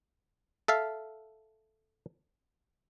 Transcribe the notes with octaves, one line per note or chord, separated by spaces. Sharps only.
A4 E5 F5